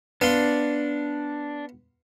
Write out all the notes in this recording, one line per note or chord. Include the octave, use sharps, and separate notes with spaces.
B3 D4 F5 C6